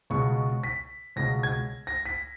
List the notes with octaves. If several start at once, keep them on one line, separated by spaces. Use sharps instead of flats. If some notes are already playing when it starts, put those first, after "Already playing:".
C#2 B2 G#3 C#6
B6
C#2 B2 G#3 A#6
G#6
A#6
B6